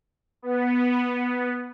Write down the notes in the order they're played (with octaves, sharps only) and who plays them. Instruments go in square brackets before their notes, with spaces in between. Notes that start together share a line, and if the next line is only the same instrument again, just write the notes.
[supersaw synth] B3